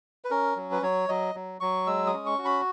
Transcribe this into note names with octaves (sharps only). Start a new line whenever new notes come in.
B4
C#4 A#4
F#3
B4
F#3 C#5
F#3 D#5
F#3
F#3 C#6
G#3 E6
D#6
C#4
C#6
F#4
B5